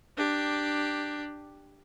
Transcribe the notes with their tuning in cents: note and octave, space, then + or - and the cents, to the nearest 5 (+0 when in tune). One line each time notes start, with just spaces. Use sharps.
D4 +10 G4 +0